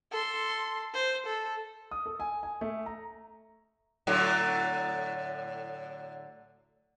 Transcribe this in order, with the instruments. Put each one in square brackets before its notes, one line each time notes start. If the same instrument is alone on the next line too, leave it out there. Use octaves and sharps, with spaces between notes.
[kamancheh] A4 C6
C5
A4
[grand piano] D#6
A4
G#5
G#5
A3
A#5
[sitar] A2 D3 F#3